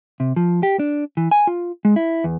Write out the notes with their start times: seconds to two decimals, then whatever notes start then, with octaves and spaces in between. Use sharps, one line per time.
0.20 C3
0.36 F3
0.63 G4
0.79 D4
1.17 E3
1.31 G#5
1.47 F4
1.85 G#3
1.96 E4
2.24 E2